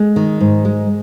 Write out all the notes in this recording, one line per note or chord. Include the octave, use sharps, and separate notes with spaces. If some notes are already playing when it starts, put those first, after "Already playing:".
Already playing: G#3
D#3
G#2
G#3